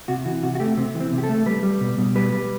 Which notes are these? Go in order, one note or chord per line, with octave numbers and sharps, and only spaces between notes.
C3 F#4
E3 F#4
C3 F#4
F#4
A3 G4
C3 C4
E3
C4
C3
G4
A4
A3
G3 B4
G3
B2
B2
G3 B4
G3